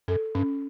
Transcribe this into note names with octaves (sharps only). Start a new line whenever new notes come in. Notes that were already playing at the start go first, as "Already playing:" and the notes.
F#2 A4
G2 C#4